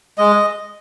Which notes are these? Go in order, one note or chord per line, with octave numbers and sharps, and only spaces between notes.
G#3 D#5